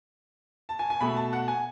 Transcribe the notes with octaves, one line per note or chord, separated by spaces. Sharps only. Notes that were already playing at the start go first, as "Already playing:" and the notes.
A5
G#5
G#5
B2 A3 B5
A5
F#5
G#5